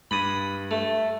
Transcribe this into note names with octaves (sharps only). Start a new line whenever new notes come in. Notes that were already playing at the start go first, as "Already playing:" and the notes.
G2 B5 D#6
A3